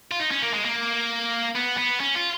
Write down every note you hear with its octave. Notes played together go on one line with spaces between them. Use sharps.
F4
D#4
C#4
A#3
G#3
A#3
B3
B3
C#4
F4